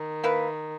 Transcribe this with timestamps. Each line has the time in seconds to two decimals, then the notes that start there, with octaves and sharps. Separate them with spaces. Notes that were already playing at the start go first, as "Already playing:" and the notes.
Already playing: D#3
0.24 A#3 E4 B4